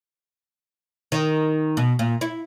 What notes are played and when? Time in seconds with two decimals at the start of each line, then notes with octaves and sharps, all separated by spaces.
1.12 D#3
1.77 B2
1.99 A#2
2.21 E4